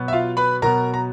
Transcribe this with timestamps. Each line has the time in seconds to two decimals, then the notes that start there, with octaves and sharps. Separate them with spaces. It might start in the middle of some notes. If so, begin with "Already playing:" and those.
Already playing: B2 F#3 B3
0.08 E5
0.13 F4 F5
0.37 B4 B5
0.62 B2 F#3 B3 A#4 A#5
0.94 A#5